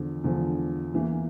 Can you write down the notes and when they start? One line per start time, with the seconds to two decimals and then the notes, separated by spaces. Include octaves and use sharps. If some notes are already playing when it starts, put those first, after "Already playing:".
Already playing: E2 D3 F3
0.24 E2 D3 F3
0.94 E2 E3 A#3